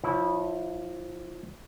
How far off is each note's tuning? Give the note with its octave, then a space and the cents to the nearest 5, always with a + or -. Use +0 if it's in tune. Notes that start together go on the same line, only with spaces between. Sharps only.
F3 +15 E4 -20 C#5 +25